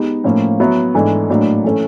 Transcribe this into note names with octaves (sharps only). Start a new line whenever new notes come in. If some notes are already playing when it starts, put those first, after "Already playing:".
Already playing: G#3 B3 D#4 G4
A2 F3 A#3 C#4
F#3 B3 E4
G#2 E3 A3 D4
A2 F#3 A#3 D4
E3 A3 C#4